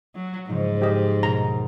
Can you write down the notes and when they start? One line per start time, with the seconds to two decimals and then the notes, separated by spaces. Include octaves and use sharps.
0.15 F#3
0.49 G#2 C#3 F3 D#4
0.82 G4 D#5
1.23 D#2 B2 D#3 A#5